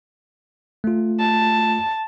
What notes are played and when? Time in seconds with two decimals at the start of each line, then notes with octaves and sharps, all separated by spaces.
0.84 A3 F4
1.20 A5